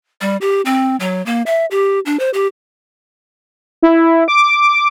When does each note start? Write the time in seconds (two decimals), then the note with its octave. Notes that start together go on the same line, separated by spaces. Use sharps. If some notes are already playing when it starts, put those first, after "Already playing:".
0.21 G3
0.41 G4
0.65 C4
1.00 F#3
1.26 A#3
1.46 E5
1.71 G4
2.06 D4
2.20 C5
2.34 G4
3.83 E4
4.28 D6